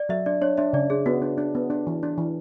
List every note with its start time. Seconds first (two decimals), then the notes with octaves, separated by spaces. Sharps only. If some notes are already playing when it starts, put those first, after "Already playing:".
Already playing: D5
0.09 F#3 E5
0.26 D4 D5
0.41 D4 C#5
0.58 D4 E5
0.73 C#3 D5
0.90 D4 G#4
1.06 B3 F#4
1.22 D4
1.38 D4
1.55 B3
1.70 D4
1.87 E3
2.03 D4
2.18 E3